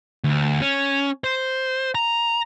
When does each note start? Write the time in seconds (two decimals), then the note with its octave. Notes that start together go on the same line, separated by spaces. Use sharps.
0.24 D2
0.61 C#4
1.24 C5
1.95 A#5